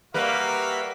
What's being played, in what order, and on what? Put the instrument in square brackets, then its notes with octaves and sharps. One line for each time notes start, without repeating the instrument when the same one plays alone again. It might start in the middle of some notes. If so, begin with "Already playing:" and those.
[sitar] G3 A#3 B4 [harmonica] F#4 E5 F5